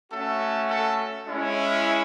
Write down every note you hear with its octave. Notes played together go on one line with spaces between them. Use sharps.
A3 C#4 F#4 A4
A4
G#3 C#4 E4